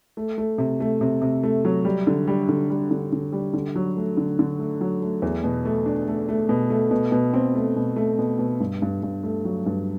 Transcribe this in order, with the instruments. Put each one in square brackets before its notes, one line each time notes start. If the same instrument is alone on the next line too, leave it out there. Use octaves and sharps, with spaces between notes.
[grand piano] A3
A3
C3
A3
C3
C3
A3
F#3
G3
D3
G3
D3
G3
D3
D3
G3
D3
F#3
A3
D3
D3
A3
F#3
A3
E2
B2
A3
D4
A3
A3
B2
A3
B2
B2
C4
A3
B2
A3
B2
B2
G2
G2
G2
A3
F#3
G2